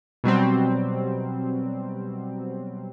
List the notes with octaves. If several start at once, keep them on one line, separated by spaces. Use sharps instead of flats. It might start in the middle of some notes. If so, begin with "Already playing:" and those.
B2 F#3 G3 C4